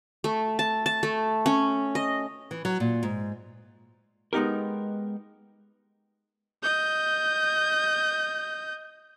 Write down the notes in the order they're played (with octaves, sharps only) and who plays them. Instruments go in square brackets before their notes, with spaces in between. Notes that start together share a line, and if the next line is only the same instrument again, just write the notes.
[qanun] A3
A5
A5
A3
C#4
D#5
[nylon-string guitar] E3
F#3
A#2
G#2
[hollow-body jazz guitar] G#3 B3 D#4 G4 A#4
[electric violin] D#5 G6